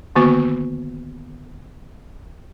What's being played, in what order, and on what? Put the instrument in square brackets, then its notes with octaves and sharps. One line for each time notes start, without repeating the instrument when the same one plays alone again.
[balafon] D3 D#3 A#3 B3 F#4 C#6